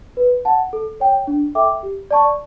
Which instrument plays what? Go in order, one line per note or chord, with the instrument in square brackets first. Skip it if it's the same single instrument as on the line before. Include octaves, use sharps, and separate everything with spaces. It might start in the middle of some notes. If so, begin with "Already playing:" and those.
[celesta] B4
F#5 A5
A4
C#5 G5
D4
A4 E5 G5 D6
G4
D5 A5 C#6